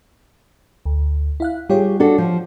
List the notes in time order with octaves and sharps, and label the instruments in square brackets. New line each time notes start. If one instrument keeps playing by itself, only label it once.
[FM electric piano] D2
E4 F5 F#6
[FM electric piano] G3 F4 C#5 [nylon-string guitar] G4 G#4
[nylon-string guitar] D4 F#4 A4
F3